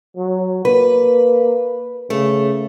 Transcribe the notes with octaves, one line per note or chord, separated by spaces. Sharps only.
F#3
A#3 B4
C#3 A3